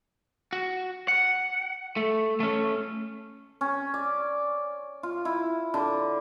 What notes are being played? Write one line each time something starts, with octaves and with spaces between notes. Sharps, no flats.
F#4
F#5
A3
A3 C#4
C#4
D5
F4
E4
D3